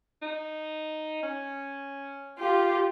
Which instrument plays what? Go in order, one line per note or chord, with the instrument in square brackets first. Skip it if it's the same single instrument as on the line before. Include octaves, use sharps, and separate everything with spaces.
[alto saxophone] D#4
C#4
[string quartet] F4 G4